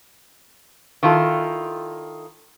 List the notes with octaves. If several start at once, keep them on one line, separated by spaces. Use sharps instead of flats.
D#3 E4 F4 A4